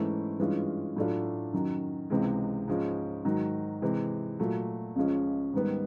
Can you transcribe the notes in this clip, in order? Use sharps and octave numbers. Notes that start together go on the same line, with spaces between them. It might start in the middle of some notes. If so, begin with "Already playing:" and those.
Already playing: G#2 E3 A3 C#4 E4
G2 E3 G#3 C#4 F4
A2 F#3 A3 D4 F4
F#2 D#3 F#3
C#2 C3 E3 G#3
G#2 F3 G#3 C#4
G#2 D#3 F#3
C3 E3 G#3
A#2 F#3 A3
C#2 C#3 F3 G#3 C#4
G#2 D#3 G3 B3